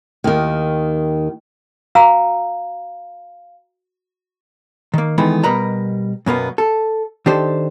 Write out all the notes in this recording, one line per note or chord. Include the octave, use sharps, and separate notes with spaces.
D#2 D#3
F#4 F5 A#5 E6
D#3 A#3
D#3 E3 G#3 A3 B3
B2 G3 A#4 B4 D#5 A#5
F#2 B2 A#3 B3
A4
D#3 D4 G4 A4 C5